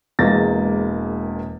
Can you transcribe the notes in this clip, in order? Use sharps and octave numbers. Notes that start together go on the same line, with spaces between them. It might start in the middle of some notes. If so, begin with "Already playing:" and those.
E1 E2 G#3 A#3 A6 A#6